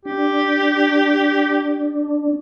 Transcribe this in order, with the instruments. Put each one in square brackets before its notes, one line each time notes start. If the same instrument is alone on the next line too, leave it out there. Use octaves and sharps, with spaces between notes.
[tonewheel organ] D4 [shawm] G4